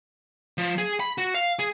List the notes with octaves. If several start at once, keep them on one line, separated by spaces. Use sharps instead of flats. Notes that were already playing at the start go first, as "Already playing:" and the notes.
F3
G#4
B5
F#4
F5
G#4